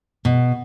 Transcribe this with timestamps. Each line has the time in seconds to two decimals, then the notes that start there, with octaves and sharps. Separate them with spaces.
0.25 B2